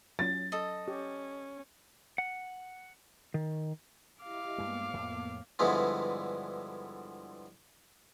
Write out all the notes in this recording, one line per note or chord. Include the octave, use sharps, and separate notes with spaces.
F#3 C#4 A6
A4 D#5
C#4 G4
F#5
D#3
E4 G4 D#5 F5 D6
G2 G#3 A#3 B3
F2 A2
G2 D3 E3 F3 G#3 B3